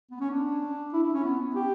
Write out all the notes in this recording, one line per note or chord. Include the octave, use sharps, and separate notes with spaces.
B3
C#4
D4
E4
E4
C#4
B3
G4